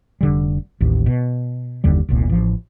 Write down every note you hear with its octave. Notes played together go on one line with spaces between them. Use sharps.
F1 D3 G3
A1 D#2
B2
F#1 D#2 D3 G3
E1 C2 A#2
A1 F3